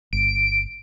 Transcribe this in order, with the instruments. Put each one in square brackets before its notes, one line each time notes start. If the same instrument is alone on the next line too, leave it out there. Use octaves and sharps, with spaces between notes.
[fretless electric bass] G1 [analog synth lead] D7